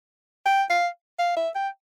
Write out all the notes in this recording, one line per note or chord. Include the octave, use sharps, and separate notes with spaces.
G5
F5
F5
E5
G5